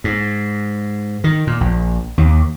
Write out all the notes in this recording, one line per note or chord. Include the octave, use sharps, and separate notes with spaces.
G#2
D#3
A#2
A#1
D#2